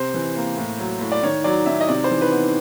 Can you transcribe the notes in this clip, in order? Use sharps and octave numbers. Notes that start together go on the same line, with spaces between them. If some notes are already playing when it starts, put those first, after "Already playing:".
Already playing: C3 C5
E3
A#3
A2
F#3
A2
D5
D#3 C#5
F#3 D5
D#3 E5
D#5
C3 D5
C5
E3
B4
B3